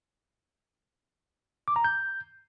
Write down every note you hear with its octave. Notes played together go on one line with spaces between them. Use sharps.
D6
A#5
G6